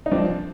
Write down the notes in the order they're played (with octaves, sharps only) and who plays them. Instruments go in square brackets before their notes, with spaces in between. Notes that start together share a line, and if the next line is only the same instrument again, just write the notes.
[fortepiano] D#4
F3 C4 D4